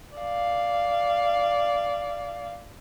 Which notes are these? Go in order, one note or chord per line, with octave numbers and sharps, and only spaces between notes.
D5 F5